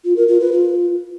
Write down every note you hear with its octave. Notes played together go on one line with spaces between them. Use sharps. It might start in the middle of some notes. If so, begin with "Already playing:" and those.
F4
A#4
F4
B4
F4